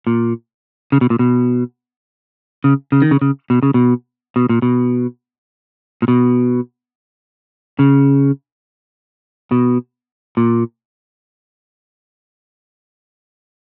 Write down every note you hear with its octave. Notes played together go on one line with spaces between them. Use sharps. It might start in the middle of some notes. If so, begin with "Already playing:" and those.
A#2
C#3
B2
A#2
B2
C#3
C#3
D#3
C#3
C#3
B2
C#3
B2
B2
A#2
B2
A#2
B2
C#3
B2
A#2